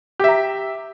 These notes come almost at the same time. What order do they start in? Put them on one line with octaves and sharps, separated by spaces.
G4 E5 A#5